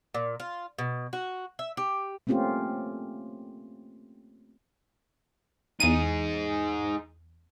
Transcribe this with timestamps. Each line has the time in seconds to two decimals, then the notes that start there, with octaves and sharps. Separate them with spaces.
0.14 A#2
0.40 F4
0.79 B2
1.13 F#4
1.59 E5
1.77 G4
2.27 A3 A#3 C4 C#4 F4 G4
5.80 E2 D#4 G#4 D#7